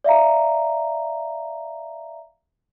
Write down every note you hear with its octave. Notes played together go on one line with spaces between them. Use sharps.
D5 E5 F5 A#5